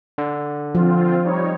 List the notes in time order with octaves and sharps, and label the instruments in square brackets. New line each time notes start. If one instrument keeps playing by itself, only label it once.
[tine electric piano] D3
[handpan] F3 [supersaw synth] C4 F4
[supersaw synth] G3 D#4 C#5